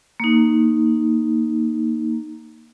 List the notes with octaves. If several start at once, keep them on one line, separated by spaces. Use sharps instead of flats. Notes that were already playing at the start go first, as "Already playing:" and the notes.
A#3 D#4